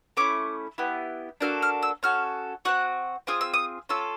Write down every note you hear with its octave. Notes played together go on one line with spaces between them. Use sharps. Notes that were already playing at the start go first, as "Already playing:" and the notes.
A3 C#4 E4 D6
B3 E4 G4
A#3 D4 F#4 A4 F6
F6
E6
C#4 F#4 A4 F6
C4 D#4 F#4 F#6
C4 F4 G#4 D#6
E6
D#6
C#4 F4 A4 E6